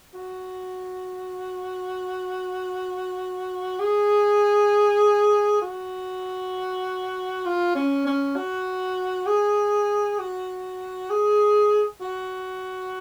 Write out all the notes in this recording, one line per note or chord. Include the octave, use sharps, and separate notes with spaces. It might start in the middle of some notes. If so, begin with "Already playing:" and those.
F#4
G#4
F#4
F4
C#4
C#4
F#4
G#4
F#4
G#4
F#4